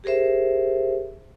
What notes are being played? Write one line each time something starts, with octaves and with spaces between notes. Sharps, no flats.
G4 G#4 A#4 C5 E5